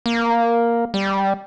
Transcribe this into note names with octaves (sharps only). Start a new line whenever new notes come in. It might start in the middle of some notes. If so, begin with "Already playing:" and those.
A#3
G3